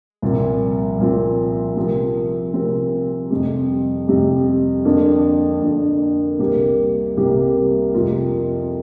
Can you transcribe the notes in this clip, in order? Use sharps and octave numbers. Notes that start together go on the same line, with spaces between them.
C2 A#2 F3 C4
C2 A#2 F3 C4
C3 F3 C4 A#4
C3 F3 C4 A#4
F2 C3 G3
F2 C3 G3
F2 D3 A#3 D4
F2 D3 A#3 D4
C2 C3 A#3 G4 A#4
C2 C3 A#3 G4 A#4
F2 C3 A#3 F4 A#4